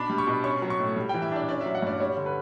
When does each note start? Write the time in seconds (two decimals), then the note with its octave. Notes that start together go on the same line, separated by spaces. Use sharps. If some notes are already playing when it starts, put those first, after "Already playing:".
Already playing: B2 D4 B5
0.10 G3
0.18 C#6
0.27 B2
0.44 C#4 C#6
0.62 F#3
0.70 C#6
0.79 A2
0.96 G3
1.09 E3 G5
1.22 E5
1.31 D4 D5
1.49 C#4 D5
1.61 E5
1.66 F#3
1.75 F#5
1.82 G2 D5
2.00 G3 C#5
2.17 D3
2.26 B4